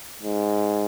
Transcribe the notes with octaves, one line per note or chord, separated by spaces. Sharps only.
G#2